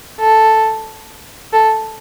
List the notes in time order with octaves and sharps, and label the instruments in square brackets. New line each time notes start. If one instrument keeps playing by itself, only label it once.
[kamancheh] A4
A4